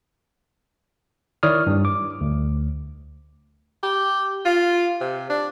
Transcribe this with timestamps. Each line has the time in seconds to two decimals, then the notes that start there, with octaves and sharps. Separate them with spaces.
1.43 D#3 E4 C#5 D5 D#6 F6
1.67 G2 G3
1.85 D6
2.21 D2
3.83 G4
4.45 F4
5.01 C3
5.30 D4